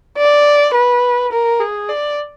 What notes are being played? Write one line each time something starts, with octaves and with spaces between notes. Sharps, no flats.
D5
B4
A#4
G#4
D5